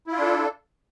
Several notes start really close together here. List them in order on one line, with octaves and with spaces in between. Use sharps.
E4 F4 D4 A4